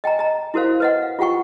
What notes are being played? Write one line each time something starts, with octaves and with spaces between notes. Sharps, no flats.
D#5 G5 G#5 A#5
D#5 A#5
E4 F#4 A#4 C5 F5
B4 D#5 F#5
F5
F4 G4 F#5 G5 C#6